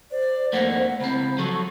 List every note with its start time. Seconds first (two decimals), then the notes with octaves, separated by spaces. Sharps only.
0.11 C5 D5
0.53 F2 A3 A#3 F#5
1.00 C#2 C4 A#5 B5
1.38 F3 F#3 A4 C#6